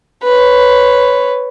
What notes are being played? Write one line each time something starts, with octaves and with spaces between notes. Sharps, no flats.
B4 C#5